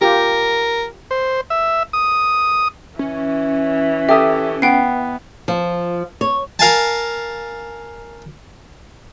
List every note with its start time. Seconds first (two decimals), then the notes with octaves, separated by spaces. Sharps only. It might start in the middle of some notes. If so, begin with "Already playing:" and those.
0.01 F4 G4 A#4
1.11 C5
1.50 E5
1.93 D#6
2.99 E3 C#4
4.09 G4 A4 E5 D#6
4.62 B3 F#5 G5 C7
5.48 F3
6.21 C#5
6.59 A#4 F5 G#5 A5